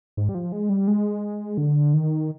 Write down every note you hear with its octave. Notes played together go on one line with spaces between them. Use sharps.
G#2
G3
F3
G#3
G3
G#3
D3
D#3